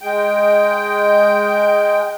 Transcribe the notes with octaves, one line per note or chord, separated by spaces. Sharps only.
G#3 G5